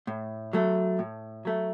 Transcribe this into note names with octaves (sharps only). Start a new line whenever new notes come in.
A2
F#3 A3
A2
F#3 A3